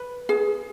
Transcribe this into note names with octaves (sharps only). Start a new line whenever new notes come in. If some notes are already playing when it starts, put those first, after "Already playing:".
Already playing: B4
G#4